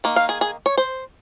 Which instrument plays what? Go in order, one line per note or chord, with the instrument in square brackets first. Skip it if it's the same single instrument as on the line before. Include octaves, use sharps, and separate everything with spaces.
[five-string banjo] D#3 A#3
F5
G#4
G#4
C#5
C5